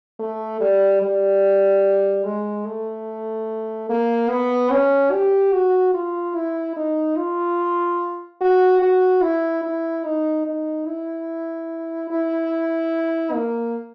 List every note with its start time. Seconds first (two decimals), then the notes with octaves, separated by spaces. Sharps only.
0.19 A3
0.61 G3
1.02 G3
2.24 G#3
2.66 A3
3.89 A#3
4.30 B3
4.71 C#4
5.12 G4
5.53 F#4
5.94 F4
6.35 E4
6.77 D#4
7.17 F4
8.41 F#4
8.82 F#4
9.22 E4
9.64 E4
10.04 D#4
10.46 D#4
10.86 E4
12.10 E4
13.33 A#3